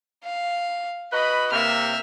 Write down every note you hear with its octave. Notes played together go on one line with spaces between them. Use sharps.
F5
F#4 B4 D#5 B5
C3 A#3 E5 F6